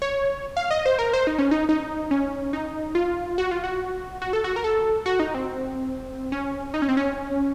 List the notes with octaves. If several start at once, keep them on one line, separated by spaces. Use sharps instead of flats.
C#5
F5
D#5
C5
A#4
C5
D#4
C#4
D#4
D#4
C#4
D#4
F4
F#4
F4
F#4
F#4
A4
F#4
A#4
A4
F#4
D#4
C4
C#4
D#4
C#4
C4
C#4